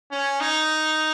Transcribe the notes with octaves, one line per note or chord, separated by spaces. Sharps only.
C#4
D#4